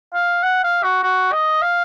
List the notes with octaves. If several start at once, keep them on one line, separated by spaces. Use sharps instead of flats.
F5
F#5
F5
F#4
F#4
D#5
F5